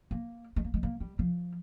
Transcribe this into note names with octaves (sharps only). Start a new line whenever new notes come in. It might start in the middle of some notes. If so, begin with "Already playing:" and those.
A#3
G#3
A#3
G#3
A#3
G3
F3